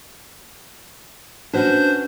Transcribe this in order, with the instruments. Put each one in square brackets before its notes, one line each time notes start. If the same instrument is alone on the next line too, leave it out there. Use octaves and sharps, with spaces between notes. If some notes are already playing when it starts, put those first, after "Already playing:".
[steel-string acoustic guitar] C#4 F#4 B4 [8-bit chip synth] D4 C5 G6